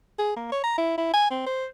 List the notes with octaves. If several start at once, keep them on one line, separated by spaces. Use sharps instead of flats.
G#4
A#3
C#5
A#5
E4
E4
G#5
C4
C5